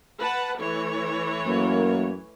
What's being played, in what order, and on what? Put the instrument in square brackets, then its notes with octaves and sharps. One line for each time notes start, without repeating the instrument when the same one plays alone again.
[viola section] B4 F#5 A5
E3 A3 C#5
[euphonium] F#2 [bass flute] A#3